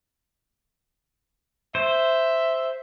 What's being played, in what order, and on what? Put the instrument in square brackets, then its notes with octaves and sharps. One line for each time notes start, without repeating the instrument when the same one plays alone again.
[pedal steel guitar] C5 [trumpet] E5